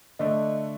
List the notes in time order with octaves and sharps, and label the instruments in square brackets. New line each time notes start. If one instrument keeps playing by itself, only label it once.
[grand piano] D3 A3 D4 [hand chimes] D#5